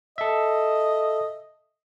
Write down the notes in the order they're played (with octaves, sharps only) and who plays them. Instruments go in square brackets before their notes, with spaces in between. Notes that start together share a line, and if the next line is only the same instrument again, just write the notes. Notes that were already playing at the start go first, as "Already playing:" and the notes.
[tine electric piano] A4 E5 [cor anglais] D#5